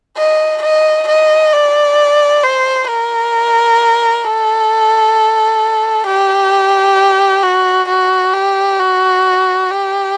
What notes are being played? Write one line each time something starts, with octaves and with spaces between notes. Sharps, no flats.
D#5
D#5
D#5
D5
C5
A#4
A4
G4
F#4
F#4
G4
F#4
G4